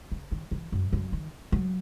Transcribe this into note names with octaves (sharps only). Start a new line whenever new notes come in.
C#3
D#3
E3
F#2
F#2
D#3
F#3